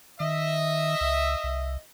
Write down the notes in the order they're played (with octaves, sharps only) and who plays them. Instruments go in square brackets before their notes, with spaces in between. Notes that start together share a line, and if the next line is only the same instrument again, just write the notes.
[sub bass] D#3 [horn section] D#5 E5
[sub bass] C#2
C2